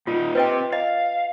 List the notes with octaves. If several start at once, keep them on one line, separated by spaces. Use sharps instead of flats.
A#2 D#4 F4
C4 G4 B4 D#5 G5
D#5 F5